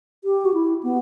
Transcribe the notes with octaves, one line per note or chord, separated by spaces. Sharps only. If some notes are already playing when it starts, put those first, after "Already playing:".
G4
F#4
E4
B3